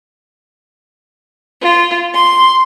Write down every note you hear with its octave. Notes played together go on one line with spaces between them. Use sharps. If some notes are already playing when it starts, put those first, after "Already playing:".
F4
C6